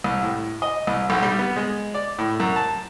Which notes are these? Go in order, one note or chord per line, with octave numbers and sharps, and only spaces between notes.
C2
A2
D#5
C2
B1
G3
B3
G#3
D5
A2
F#2
A5